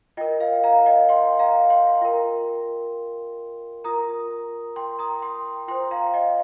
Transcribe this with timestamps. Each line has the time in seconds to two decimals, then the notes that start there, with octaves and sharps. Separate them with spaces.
0.17 F4 A#4 D#5 G5
0.40 F5
0.64 F5 A#5
0.86 D#5 G5
1.09 G5 C6
1.39 F5 A#5
1.70 G5 C6
2.01 F4 A#4
3.84 F4 A#4 A#5 D#6
4.76 G5 C6
4.99 A#5 D#6
5.22 G5 C6
5.68 F4 C5 G5 C6
5.91 F5 A#5
6.14 D#5 G5